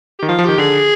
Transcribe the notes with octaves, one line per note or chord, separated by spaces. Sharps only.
D#3 G4
F3 F4
F3
D#3 G4
D3 G#4